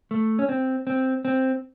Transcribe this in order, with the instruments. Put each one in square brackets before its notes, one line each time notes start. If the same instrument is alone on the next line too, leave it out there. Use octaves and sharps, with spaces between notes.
[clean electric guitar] A3
C#4
C4
C4
C4